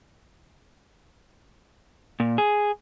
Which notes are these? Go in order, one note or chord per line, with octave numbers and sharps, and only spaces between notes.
A#2
G#4